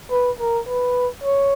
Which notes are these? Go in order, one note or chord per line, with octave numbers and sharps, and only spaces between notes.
B4
A#4
B4
C#5